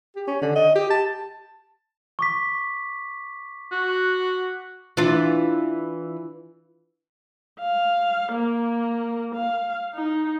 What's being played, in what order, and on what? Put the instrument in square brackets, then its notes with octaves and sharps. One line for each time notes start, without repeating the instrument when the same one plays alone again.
[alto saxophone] G4
C#4
D3
D#5
G4
A5
[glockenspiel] C#6 D6 B6
[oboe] F#4
[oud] E3 D4 F4
[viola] F5
A#3
F5
D#4